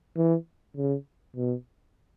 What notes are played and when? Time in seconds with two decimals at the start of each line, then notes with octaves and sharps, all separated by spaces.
0.17 E3
0.77 C#3
1.36 B2